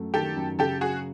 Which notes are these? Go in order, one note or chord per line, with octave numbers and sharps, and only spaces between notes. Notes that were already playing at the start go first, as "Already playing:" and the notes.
Already playing: F#2 A3
D#3 G4 A4
F#2
C#3 G4 A4
F#3 F#4 G#4